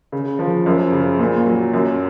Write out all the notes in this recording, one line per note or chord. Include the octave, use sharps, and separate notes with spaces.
C#3
F3
F#2
C#3
A#2
F#3
F#2